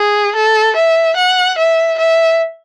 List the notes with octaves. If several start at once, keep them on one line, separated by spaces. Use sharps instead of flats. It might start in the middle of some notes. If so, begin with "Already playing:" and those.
Already playing: G#4
A4
E5
F#5
E5
E5